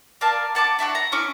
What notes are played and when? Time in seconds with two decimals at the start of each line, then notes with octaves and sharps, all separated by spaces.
0.21 A#4 D5 F5 A5
0.55 F#5 A5 B5 D6
0.79 D4 E4 F#4 F#5
0.95 A#5
1.12 C#4 E4 C#6 D6